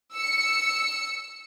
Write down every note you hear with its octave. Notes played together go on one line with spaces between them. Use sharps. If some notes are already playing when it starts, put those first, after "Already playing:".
E6 C#7